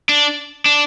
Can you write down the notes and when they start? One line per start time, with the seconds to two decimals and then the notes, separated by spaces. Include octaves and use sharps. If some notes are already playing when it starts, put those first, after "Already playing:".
0.09 D4
0.65 D4